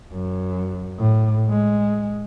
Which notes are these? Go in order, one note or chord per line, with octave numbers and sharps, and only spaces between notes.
F#2
A2
G#3